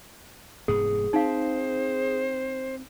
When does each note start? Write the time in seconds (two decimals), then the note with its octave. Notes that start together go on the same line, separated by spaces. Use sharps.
0.68 F1 G#2 B3 G#4
1.13 C4 D#4 C5 F5